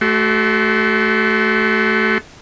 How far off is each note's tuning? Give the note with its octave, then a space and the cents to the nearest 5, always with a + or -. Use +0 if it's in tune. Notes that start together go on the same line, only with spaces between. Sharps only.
A3 -20 F#4 +35 C6 +0